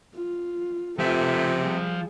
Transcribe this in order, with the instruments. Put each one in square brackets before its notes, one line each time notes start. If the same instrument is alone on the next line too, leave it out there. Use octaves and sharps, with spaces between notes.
[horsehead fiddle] F4
[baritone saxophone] C3 [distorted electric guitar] F3 E5 [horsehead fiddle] F4 A4
[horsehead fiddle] G3 G#4